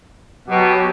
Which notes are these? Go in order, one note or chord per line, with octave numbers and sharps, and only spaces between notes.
B2 F#3 G4